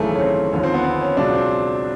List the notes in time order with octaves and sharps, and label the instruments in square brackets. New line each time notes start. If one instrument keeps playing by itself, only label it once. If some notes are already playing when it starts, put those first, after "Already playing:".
Already playing: [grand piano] G#1 F#2 C#3 E3 A3
C#4
C4
D#2 D3 F3 C#4
C4
B3
C4
C#4
C#2 B2 F#3 D4
C4